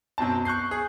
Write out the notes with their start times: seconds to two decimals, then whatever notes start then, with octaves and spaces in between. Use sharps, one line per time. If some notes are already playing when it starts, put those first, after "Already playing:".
0.18 F#2 B2 C4 A5
0.45 C#6 F#6 G6 C7
0.71 G#4